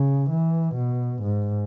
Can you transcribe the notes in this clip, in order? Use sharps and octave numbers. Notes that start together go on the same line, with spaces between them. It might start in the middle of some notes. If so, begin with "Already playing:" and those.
Already playing: C#3
E3
B2
G#2